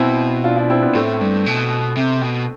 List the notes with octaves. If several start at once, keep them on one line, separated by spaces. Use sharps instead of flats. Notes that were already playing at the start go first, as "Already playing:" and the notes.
Already playing: B2 C4 E4
D4 F4
D4 F4
C4 E4
B3 D4
A2 A3 C4
G2
B2
C3
B2